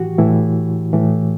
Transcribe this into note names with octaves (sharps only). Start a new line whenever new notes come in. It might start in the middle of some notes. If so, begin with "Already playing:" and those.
Already playing: A2 E3 F#4 G4
A2 E3 E4
A2 E3